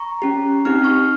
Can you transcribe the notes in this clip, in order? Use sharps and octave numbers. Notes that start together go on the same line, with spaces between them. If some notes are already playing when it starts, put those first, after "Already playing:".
Already playing: A#5 C#6
C#4 G4
C4 D#4 G4 F6
C#6 F6